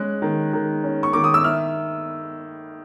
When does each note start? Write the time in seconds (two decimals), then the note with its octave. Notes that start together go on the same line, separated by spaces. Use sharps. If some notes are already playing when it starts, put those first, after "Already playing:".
Already playing: G#3 C#4 F#6
0.22 D#3
0.53 D#3
0.84 C#4
1.03 C#6
1.13 D#3 D6
1.24 D#6
1.34 E6
1.44 E4 F6